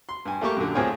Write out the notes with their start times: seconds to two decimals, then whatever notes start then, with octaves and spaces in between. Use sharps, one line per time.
0.09 C6
0.25 G2 G#5
0.41 A3 A#3 G4 C#6
0.57 F#2 A#2 D3
0.75 D2 A2 C4 F4 G#4 C#5